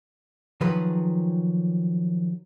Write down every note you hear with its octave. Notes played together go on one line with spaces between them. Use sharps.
D#3 F3 F#3 G#4 B4